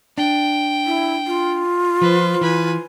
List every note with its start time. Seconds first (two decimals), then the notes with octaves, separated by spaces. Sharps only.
0.18 D4 G5
0.86 E4
1.27 F4
2.01 F3 B4 C5
2.41 E3 B4 G#5